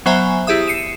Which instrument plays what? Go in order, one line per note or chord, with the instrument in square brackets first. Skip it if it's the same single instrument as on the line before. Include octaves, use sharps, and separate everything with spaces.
[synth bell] F#3 B3 C5 E5 G#5 A#5
E4 G4 G#4 E5 D#6
C7 C#7 D#7 E7